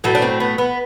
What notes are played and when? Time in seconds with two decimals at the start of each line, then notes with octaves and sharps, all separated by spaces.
0.04 A2 F#3 A3 B4
0.15 D4
0.22 C4
0.40 B3
0.58 B3